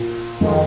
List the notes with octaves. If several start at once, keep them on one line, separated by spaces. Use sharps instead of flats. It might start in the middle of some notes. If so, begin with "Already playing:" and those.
Already playing: A#2
F2 D#3 G#3